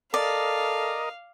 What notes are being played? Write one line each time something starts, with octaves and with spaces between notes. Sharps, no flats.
A4 A#4 D5 D#5 F5